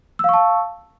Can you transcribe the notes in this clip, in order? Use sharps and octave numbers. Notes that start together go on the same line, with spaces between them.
F5 A5 C#6 E6